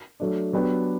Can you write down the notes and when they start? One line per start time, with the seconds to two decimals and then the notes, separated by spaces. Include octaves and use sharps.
0.20 F#3 A3 D4
0.53 F#3 B3 D4 G4